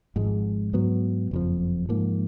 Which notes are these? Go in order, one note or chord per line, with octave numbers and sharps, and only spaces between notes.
G#1 G#2 F3 G#3
G#2 F#3 B3
F#1 F2 F3
G#2 F3 A#3